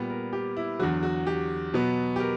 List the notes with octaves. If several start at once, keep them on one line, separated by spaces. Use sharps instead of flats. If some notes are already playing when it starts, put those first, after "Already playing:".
Already playing: A#2 G3 B3
A#4
G4
E4
E2 D3 F#3 F#4
F#4
G4
B2 F#3 B3
G4
A#4